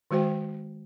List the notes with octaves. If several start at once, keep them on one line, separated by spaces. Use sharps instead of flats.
D#3 G#3 F#4 C5 G5